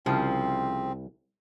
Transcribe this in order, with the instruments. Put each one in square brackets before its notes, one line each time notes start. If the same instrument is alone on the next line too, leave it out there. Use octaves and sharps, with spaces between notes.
[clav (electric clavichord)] C2 [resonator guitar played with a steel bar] C#3 F3 [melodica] C4